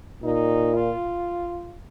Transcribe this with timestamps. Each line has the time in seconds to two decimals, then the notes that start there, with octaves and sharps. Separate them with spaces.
0.24 A#2 D#4
0.74 F4